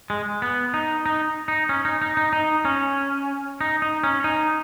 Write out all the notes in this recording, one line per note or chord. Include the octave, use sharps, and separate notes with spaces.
G#3
B3
D#4
D#4
D#4
C#4
D#4
D#4
D#4
D#4
C#4
D#4
D#4
C#4
D#4